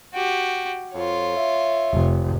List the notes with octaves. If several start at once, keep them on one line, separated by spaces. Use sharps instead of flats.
F#4 G4
F2 F4 C#5
E5
F1